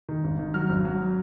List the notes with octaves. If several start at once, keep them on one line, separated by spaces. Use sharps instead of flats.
D#3
G#1
D#3
F#3 F6
G#1
F#3